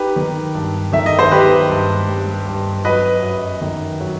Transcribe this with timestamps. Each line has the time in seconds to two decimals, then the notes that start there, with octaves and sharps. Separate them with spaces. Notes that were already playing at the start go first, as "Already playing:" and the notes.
Already playing: D#4 G4 B4
0.16 D#3
0.55 G2
0.93 D#3 E5
1.06 D#5
1.19 C5
1.31 D#3 G4 B4
1.69 G2
2.08 G3
2.46 G2
2.85 F#3 B4 D#5
3.23 F#2
3.61 D#3
4.00 F#3